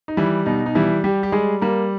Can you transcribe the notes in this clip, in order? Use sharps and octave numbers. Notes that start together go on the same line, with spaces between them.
D#4
E3 G3 E4
B2 D#4
D#4
E3 G3 E4
G3 G4
G4
G3 G#3 G#4
G3 A#3 A#4